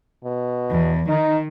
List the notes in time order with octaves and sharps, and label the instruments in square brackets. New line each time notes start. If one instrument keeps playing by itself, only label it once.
[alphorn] B2
[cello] E2
[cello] D#3 [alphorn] D#4